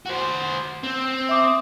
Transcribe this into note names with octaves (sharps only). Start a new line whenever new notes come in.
F#4 C5
C4
E5 D6 D#6